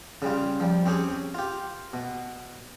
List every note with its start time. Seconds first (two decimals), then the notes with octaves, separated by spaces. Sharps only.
0.22 C#3 G3 F4
0.60 F3 G3
0.85 C4 C#4 G4 G#4
1.34 F4 G4
1.93 B2